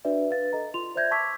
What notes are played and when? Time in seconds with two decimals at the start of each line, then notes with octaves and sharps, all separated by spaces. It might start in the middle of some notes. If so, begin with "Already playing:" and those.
0.05 D4 F#4 B4 D5 E5
0.30 B4 F5 A6
0.53 A4 D#5 A#5
0.74 F4 C6 F7
0.96 C5 D5 E5 G6 G#6 A#6
1.11 A5 C#6 D6 E6 G#6 B6